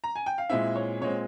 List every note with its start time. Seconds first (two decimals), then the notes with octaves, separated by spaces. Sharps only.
0.04 A#5
0.16 G#5
0.26 G5
0.38 F5
0.50 A#2 G#3 C4 E4 E5
0.76 C#5
1.01 A#2 G#3 C4 C#5